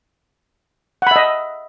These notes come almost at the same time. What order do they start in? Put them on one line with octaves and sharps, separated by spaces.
F#5 B5 E5 D#5